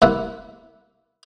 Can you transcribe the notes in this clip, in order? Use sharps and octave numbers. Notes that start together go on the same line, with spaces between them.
C2 A#3 E4 E5 F#5